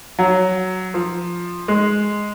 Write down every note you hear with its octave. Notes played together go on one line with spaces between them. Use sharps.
F#3
F3
G#3